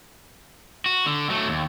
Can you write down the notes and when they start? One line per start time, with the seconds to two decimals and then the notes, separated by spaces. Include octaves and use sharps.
0.86 F#4
1.06 D3
1.30 F#3 A3
1.49 D#2